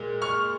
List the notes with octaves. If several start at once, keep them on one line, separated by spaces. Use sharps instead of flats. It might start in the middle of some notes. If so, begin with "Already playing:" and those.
Already playing: A#2 G#3
C#6 F6